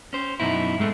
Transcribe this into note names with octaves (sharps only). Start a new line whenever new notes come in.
C#4 C5
F#2 B2 D#4 E4
G#2 G#3 A3 C4